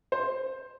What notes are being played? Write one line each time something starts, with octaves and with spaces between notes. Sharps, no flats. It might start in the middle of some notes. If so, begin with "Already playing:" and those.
C5